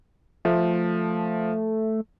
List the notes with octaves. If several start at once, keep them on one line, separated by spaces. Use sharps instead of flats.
F3 A3